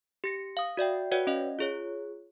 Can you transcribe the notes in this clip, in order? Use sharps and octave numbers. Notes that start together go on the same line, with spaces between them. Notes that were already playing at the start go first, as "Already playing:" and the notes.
G4 A#6 C#7
F5 D#6
F#4 D5 E5 G5
F#4 B4 C#5 D5 F#5 G5
C#4 D#5 F5
F4 G#4 C#5